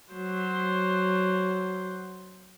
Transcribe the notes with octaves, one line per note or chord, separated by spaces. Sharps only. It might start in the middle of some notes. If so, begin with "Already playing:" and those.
F#3 C5